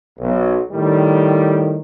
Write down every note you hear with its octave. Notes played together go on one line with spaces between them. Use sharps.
B1
A2 D#3 G3